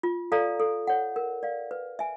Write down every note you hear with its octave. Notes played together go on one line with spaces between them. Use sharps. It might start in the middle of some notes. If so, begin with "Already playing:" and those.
F4
A4 D5 F5 A#5
A4
C#5 F#5
A#4
D5 F5
B4
E5 G#5